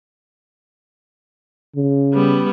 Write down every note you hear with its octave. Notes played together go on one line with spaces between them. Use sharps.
C#3
G3 B3